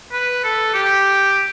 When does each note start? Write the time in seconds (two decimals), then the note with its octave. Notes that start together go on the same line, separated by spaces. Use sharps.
0.12 B4
0.44 A4
0.74 G4